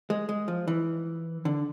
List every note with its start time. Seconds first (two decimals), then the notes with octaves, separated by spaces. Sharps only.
0.10 G#3
0.29 G#3
0.48 F3
0.68 E3
1.45 D3